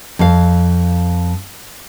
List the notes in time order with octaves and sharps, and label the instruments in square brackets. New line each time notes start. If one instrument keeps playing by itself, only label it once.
[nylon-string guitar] F2 F5